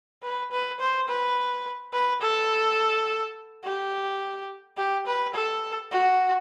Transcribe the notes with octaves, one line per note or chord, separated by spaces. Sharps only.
B4
B4
C5
B4
B4
A4
G4
G4
B4
A4
F#4